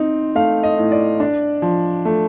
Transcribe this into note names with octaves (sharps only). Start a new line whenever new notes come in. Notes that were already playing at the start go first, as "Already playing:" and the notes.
Already playing: C4 D#4
A3 F5
D#5
A2
D5
D4
F3
A3